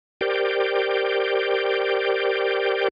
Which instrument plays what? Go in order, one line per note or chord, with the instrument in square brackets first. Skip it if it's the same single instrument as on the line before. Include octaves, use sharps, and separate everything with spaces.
[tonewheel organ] G4 A#4 C5 D5 G5